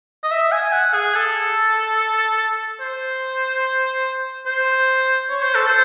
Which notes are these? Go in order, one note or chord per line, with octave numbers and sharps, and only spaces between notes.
D#5
E5
G#5
F#5
G#4
A4
C5
C5
C#5
C5
A4
C5